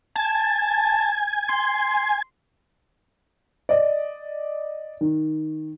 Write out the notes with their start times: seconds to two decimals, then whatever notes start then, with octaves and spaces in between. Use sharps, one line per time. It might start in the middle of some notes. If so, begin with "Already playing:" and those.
0.16 G#5 A5
1.49 C6
3.69 D5 D#5
5.01 D#3